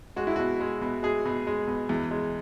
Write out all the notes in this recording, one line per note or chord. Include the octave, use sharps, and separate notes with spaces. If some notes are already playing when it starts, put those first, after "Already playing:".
G#3 F#4
E4
B2 F#4
G#3
B2
G#3 G#4
B2
G#3
B2
E2
G#3